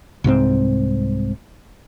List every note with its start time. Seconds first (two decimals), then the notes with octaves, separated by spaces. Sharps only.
0.24 C2 G#2 F3 C4